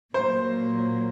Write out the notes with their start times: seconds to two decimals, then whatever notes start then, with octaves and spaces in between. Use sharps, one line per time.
0.14 A#2 F#3 A#3 C5